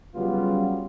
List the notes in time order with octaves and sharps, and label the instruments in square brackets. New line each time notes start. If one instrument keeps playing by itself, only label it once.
[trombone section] C#3 F#3 G3 B3 F4